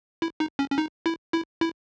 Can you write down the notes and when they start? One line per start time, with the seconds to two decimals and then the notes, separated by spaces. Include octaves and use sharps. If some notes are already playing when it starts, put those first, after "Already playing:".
0.22 E4
0.40 D#4
0.59 C#4
0.70 C#4
0.78 D#4
1.06 E4
1.33 E4
1.61 E4